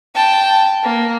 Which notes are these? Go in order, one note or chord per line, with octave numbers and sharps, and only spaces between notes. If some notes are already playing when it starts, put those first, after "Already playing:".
G5 A5
A#3